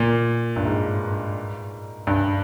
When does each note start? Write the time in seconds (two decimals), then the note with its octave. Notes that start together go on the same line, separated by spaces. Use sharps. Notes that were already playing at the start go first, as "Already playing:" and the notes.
Already playing: A#2
0.56 G2
0.65 G#2
2.07 G2